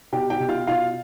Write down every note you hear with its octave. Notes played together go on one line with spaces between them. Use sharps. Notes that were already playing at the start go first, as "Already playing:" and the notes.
B2 G4 G5
G4 G5
B2
F4 F5
B2 F4 F5